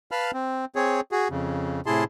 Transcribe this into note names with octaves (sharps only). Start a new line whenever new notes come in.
B4 F5 A5 B5 F6
C4
C4 G#4 C#5
F#4 G#4
F2 C#3
A2 C3 E4 G#4 A5 C6